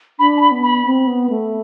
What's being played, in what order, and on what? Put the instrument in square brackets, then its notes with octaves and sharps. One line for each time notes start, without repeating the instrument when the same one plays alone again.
[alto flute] D4 [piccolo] B5
[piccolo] A5
B5
[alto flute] B3
[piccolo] B5
[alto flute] C4
B3
A3